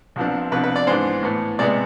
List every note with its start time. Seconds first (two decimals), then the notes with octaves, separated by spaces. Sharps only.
0.16 C2 C3 F3 B3 D4
0.52 C2 C3 F3 B3 D4 B4
0.64 B4
0.76 D5
0.87 G#2 E3 B3 D4 C5
1.23 A2 E3 B3
1.59 C3 G#3 B3 D5